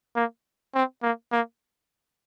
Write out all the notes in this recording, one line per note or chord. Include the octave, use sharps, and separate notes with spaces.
A#3
C4
A#3
A#3